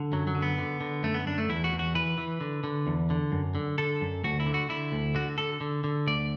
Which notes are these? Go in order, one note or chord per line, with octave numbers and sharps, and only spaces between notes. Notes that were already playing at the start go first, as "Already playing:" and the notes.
Already playing: D3
F#2 F#3
F#3
D3
B3
D3
D3
F#2 A3
B3
F#2 D4
A3
E2 E4
F#4
E2
F#4
E3 B4
E3
D3
D3
E2
D3
F#2
D3
D3 A4
F#2
D2 F#4
E4
D3
F#4
D3 E4
D2
D3 F#4
D3 A4
D3
D3
D2 D5